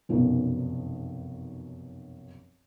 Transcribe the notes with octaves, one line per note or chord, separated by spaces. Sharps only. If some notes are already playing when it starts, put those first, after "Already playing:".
F1 B1 F#2 B2